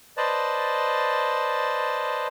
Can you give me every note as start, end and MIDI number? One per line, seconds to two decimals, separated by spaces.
0.17 2.27 71
0.17 2.27 72
0.17 2.27 74
0.17 2.27 75
0.17 2.27 81